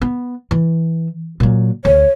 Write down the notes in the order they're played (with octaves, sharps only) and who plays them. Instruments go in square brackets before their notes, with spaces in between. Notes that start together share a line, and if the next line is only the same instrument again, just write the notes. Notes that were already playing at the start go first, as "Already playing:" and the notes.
[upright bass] B3
E3
A#2 F#3
[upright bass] D2 [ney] C#5